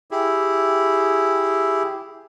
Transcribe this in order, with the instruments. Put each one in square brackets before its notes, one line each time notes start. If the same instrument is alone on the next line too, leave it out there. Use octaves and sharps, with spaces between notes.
[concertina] E4 G4 G#4